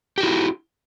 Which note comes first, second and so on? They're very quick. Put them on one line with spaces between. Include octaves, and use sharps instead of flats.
G4 F#4 E4